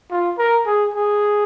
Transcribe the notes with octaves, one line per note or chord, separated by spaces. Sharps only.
F4
A#4
G#4
G#4